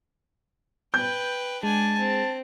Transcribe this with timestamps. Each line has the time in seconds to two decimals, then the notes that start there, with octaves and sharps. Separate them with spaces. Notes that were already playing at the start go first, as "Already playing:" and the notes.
0.94 B4 G5 G6
1.63 G#3 D4 G#5 A5
1.98 C4